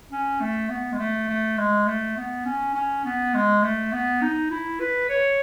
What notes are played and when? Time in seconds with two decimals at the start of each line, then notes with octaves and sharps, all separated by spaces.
0.11 C#4
0.41 A3
0.69 B3
0.92 G#3
0.98 A3
1.29 A3
1.57 G#3
1.86 A3
2.17 B3
2.45 C#4
2.74 C#4
3.05 B3
3.34 G#3
3.63 A3
3.92 B3
4.22 D#4
4.51 E4
4.80 B4
5.09 C#5